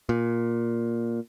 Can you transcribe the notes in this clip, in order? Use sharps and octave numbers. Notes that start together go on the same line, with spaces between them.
A#2